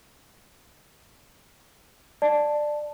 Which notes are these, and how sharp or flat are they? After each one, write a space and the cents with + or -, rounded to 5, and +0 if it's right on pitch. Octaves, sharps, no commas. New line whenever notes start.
D5 +15 A5 +0